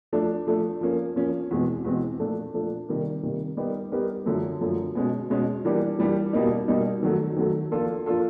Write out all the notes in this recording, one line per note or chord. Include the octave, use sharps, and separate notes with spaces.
F3 A3 D4
F3 A3 D4
F3 A#3 C#4
F3 A#3 C#4
E2 B2 G#3 C4
E2 B2 G#3 C4
A#2 F3 A3 D4
A#2 F3 A3 D4
C3 D#3 G3 A#3
C3 D#3 G3 A#3
G3 B3 D#4 G4 A#4
G3 B3 D#4 G4 A#4
F#2 D3 F3 A3
F#2 D3 F3 A3
B2 G#3 C#4
B2 G#3 C#4
E3 G3 A#3 D4 G4
E3 G3 A#3 D4 G4
B2 G3 A#3 D#4
B2 G3 A#3 D#4
D#3 F#3 A3
D#3 F#3 A3
F3 A#3 D4 F4 A4
F3 A#3 D4 F4 A4